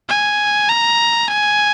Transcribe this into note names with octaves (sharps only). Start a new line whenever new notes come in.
G#5
A#5
G#5